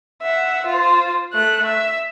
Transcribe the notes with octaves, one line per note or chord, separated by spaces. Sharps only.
E5 F#5
F4 C5
A3 F#6
E5